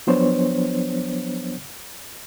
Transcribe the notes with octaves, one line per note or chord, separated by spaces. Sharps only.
F3 F#3 B3 D4 C5 C#5